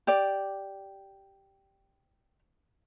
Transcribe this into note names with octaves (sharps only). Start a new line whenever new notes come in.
G4 D5